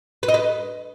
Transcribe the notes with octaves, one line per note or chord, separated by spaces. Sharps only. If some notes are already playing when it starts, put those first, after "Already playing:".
B4
D#5
B4